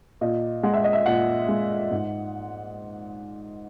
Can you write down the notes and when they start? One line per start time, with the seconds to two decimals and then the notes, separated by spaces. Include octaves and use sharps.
0.21 A#2 D#5
0.63 G#3 F#5
0.74 E5
0.84 D#5
0.93 E5
1.06 A#2 F#5
1.49 G#3
1.91 G#2